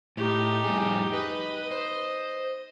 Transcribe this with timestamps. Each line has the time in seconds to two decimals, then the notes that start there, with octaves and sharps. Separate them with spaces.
0.17 A2 D#4 G4
0.64 F2 G3 G#4
1.13 B4 D#5
1.71 C5